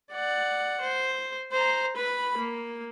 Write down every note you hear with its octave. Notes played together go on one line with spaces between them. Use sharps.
D5 F#5
C5
C5 A#5
B4 B5
A#3